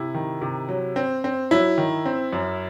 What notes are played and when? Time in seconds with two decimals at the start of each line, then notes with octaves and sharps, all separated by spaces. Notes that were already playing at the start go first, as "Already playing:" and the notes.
Already playing: C3 E4
0.14 D#3
0.42 C3
0.69 F#3
0.96 C4
1.24 C4
1.51 F#3 E4
1.78 D#3
2.06 C4
2.33 F#2